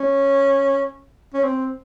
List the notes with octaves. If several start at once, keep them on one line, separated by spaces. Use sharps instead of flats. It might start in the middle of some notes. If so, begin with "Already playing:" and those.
Already playing: C#4
C#4
C4